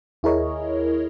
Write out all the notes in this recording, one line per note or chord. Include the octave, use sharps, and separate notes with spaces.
D#2 E4 G#4 A#4 C#5 D#5